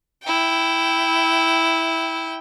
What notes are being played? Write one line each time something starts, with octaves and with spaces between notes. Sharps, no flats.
E4 G5